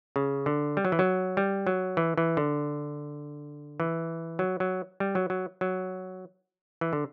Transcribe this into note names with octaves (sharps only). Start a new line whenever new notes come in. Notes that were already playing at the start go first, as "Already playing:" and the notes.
C#3
D3
G3
F#3
E3
F#3
G3
F#3
E3
E3
D3
E3
F#3
F#3
G3
F#3
F#3
F#3
E3
D3